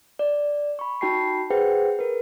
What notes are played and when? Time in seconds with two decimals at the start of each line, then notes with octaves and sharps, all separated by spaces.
0.19 D5
0.79 B5 C#6
1.01 D#4 F#4 G5 A5 B5 C7
1.50 G#4 B4 C5 F#5 G5
1.99 A#4 B4